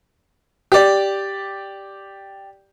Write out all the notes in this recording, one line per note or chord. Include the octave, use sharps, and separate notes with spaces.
G4 D5